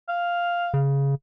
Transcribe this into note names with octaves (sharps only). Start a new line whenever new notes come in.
F5
C#3